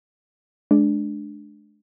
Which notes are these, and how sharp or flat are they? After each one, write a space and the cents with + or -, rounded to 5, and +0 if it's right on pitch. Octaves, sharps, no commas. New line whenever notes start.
G#3 +35 D4 +5